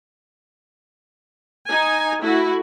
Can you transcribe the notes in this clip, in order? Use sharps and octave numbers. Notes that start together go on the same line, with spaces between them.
D#4 G#5
A3 E4 F#4